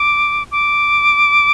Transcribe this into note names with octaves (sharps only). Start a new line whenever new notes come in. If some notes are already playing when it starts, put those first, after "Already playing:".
Already playing: D6
D6